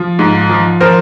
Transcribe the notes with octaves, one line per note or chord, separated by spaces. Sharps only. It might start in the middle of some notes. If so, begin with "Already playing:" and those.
Already playing: F3
G#2
F3
F3 A#4 C5